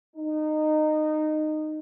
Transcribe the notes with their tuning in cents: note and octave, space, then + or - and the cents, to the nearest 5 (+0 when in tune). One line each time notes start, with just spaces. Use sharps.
D#4 -20